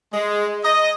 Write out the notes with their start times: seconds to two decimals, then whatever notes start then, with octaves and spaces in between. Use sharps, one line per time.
0.13 G#3
0.64 D#5